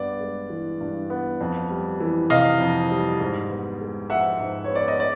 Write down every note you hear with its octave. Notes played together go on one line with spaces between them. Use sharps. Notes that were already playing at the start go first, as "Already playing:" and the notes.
Already playing: G2 B3 D5
G#3
E3
G2
B3
F2
G3
E3
C3 D#5 F5
F2
G3
G#2
B3
G#3
F3 E5 F#5
G#2
C#5
B3
D5
D#5
D5